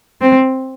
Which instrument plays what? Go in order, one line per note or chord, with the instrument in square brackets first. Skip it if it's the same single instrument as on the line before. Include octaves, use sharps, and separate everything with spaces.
[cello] C4